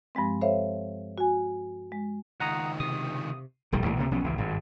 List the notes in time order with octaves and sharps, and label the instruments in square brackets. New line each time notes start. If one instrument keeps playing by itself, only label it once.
[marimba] G2 F3 G#3 C4
A4 C5 C#5 E5 F5
F#4 G#5
G#3
[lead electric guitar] C#2 D#3 [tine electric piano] F#5 A#5 D#6
[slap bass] C3 [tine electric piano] D#6
[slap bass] E1 A#1 D#3 G3
B1 A#2 E3 A3
C#2 C3 A#3
B1 F3 B3 C#4
G#1 C#2 E3
G#1 G2